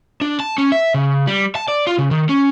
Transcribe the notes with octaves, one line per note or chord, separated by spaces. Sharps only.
D4
A5
C#4
E5
C#3
G3
A5
D5
F4
C#3
D#3
C#4